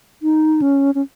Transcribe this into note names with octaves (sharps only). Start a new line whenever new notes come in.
D#4
C#4
C#4